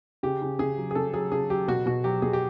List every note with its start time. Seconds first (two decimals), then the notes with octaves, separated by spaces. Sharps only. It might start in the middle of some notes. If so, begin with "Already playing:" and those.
0.23 C#3 G4
0.42 C#3
0.59 C#3 G#4
0.77 F#3
0.91 G#4
0.95 C#3 A4
1.14 F#3 G#4
1.32 C#3 G#4
1.50 F#3 G4
1.68 B2 F#4
1.86 B2 F#4
2.04 F#3 G4
2.22 B2 G#4
2.33 G4